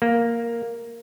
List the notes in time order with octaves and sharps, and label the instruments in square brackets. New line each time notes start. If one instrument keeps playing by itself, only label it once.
[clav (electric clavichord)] A#3